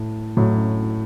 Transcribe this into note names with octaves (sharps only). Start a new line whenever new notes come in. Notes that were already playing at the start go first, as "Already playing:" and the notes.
Already playing: A2
A2 F#3